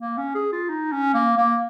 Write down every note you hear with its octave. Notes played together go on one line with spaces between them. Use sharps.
A#3
C#4
G#4
F4
D#4
C#4
A#3
A#3